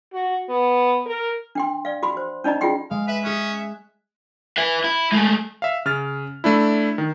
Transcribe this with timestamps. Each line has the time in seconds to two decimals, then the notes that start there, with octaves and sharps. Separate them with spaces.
0.13 F#4
0.49 B3
1.06 A#4
1.55 D4 G5 C6
1.85 D5 F5
2.03 F#4 B5 C6
2.17 C5
2.44 C#4 D#4 D5 D#5 A#5
2.61 F4 G#4 F#5 G5 C6
2.91 G#3 F5
3.08 B4 E5
3.24 C#4 G#4 F#6
4.58 B4 E5
4.84 E4
5.12 G#3 A3
5.62 E5 F5
5.86 C#3 F6 A6
6.44 A3 D4 E4
6.98 D#3